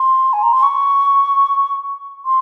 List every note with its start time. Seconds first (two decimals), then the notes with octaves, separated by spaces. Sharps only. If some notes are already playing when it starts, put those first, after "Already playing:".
Already playing: C6
0.33 G#5
0.43 A#5
0.53 C6
0.63 C#6
2.25 C6